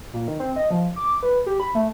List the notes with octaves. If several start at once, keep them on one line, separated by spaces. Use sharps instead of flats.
A#2
D#3
C4
D#5
F3
D6
B4
G4
B5
A3